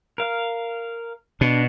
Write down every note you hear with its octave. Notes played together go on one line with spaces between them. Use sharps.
A#4 F5
B2 D4